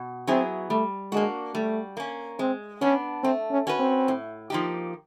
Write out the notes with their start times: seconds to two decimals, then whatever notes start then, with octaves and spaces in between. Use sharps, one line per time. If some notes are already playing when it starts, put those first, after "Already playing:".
Already playing: B2
0.27 F#3 B3 C4 E4 G#4
0.70 G3 A3
1.12 G#3 A#3 D4 F#4
1.55 G3 A3
1.97 A#3 C#4
2.39 G#3 C4
2.81 B3 C#4 D4
3.23 A3 C4
3.51 C#4
3.67 C#4 F#4 B4
3.80 C4
4.08 A2
4.50 F3 A#3 D#4 G4